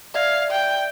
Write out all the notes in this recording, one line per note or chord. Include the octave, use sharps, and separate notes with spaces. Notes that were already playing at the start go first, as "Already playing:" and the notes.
D5 E5 F5 G#6
G5